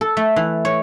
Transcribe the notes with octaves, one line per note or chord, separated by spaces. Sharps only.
A4
A3
E3
C#5